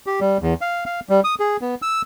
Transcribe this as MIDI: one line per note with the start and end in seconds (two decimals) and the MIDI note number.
0.06 0.20 67
0.21 0.38 55
0.42 0.54 40
0.61 0.84 77
0.86 1.00 77
1.09 1.20 55
1.24 1.35 87
1.40 1.57 68
1.61 1.75 59
1.82 2.02 88